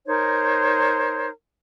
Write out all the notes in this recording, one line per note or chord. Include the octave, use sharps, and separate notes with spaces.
D#4 A#4 C5 C#5